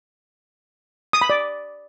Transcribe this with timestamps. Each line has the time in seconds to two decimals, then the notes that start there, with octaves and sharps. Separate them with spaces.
1.13 D#6
1.21 B5
1.30 D5